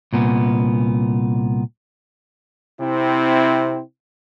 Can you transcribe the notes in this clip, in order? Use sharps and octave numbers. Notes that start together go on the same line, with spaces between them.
C2 A#2 B3
C3 C4 E4